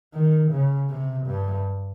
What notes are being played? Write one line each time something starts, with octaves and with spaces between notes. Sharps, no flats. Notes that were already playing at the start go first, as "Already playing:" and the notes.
D#3
C#3
C3
G2